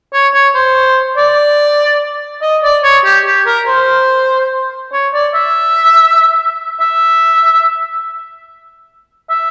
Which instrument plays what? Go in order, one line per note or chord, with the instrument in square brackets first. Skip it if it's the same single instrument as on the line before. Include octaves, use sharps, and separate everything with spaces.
[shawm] C#5
C#5
C5
D5
D#5
D5
C#5
G4
G4
A#4
C5
C#5
D5
E5
E5
E5